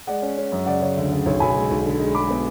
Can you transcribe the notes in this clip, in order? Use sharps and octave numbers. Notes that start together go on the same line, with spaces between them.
G#3 D5 F#5
C#4
C#4
F#2
C#3 D5 F#5
C#3 C#5
D2
C#3
B1 C#5
B1 G#5 B5
G#3
B1
D3
G#3
G#3 B5 D6
B3